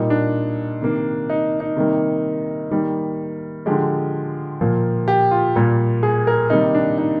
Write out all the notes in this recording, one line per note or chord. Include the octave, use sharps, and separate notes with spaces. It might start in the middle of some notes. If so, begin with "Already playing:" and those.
Already playing: A#2 G3 A#3 D#4
D4
C3 D#3 A#3
D#4
D#4
C3 D#3 G3 A#3
D#3 G3 A#3
D3 F3 G#3 G4
A#2 F3 A#3
G4
F4
A#2 G3 A#3
G#4
A#4
C3 D#3 G3 A#3 D#4
D4
D#4